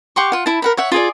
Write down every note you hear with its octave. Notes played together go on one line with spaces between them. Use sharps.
G4 F#5 C6 C#6
F4 F#5
E4 A5
A#4 F#5 B5
C#5 E5 F#5
F4 G#4 D5